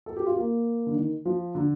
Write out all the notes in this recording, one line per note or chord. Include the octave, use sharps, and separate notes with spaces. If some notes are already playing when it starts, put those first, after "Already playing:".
A4
G4
F4
A#3
D3
D#3
F3
D3